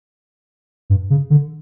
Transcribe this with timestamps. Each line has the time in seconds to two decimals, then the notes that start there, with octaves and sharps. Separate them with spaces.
0.90 G2
1.10 C#3
1.30 D3